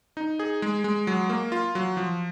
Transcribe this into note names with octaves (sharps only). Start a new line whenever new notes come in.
D#4
G#4
G#3
G#3
F#3
A#3
F4
F#3
F3